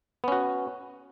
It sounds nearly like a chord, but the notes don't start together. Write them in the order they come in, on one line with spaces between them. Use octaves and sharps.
B3 C#4 F#4